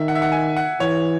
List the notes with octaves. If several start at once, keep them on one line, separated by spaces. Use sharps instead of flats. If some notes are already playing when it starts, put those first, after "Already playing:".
Already playing: D#3 E5
F#5
E5
F#5
G#5
F#5
E3 C#5